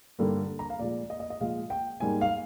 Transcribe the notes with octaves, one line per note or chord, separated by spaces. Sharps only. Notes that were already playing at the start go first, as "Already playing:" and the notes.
G2 D3 G3 A#3
A#5
F5
A#2 F3 G#3 D5
D#5
D#5
D#5
A#2 F3 G#3 F5
G5
G#2 G3 A#3 G#5
F5